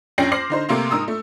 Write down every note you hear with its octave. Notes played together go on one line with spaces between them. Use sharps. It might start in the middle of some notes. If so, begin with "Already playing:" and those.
F2 C#4 G5 A#6 C7 F#7
C5 D6 F6 A#6 C7 F#7
D3 D#4 C5
C3 A3 A#3 A#5 C6
G#2 A#4 D#6 E6
A3